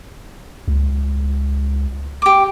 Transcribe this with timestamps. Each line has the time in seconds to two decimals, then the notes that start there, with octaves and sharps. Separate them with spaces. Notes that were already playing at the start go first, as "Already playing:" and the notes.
0.68 C#2
2.22 G4 D6